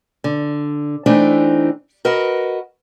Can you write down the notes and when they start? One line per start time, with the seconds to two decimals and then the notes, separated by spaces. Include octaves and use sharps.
0.24 D3
1.06 E3 A3 C4 D4 D#4
2.05 F#4 A#4 B4 D#5 F#5